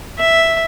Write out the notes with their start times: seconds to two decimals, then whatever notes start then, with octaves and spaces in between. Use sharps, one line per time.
0.18 E5